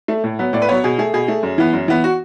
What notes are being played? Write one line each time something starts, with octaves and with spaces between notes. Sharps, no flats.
A3
A2
F#3 B3
A2 D5
B4
F#3 B3 C#5
B2 G#4
A3 G#4
B2 G#4
A3
F#2
E3 B3
F#2
E3 B3
F#4